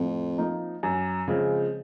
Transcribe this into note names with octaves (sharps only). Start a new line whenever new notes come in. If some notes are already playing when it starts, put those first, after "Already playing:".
Already playing: F2 A2
F3 A#3 D#4
F#2
C#3 F3 G#3 C4